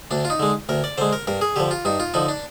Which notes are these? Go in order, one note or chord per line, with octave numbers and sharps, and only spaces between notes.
D2 D4
F4
D#4
D3 G#3
D2 A#4
D5
D3 G#3 C5
A#4
G2 A#4
G#4
D3 F3 G4
F4
G2 D#4
F4
D3 F3 D#4
D4